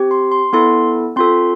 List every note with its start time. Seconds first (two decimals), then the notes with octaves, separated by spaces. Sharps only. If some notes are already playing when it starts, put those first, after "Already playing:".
Already playing: C4 G4
0.11 C6
0.31 C6
0.53 B3 E4 A4 C6
1.16 C4 F4 A4 C6